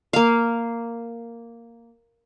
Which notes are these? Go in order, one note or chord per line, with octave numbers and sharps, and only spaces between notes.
A#3 F5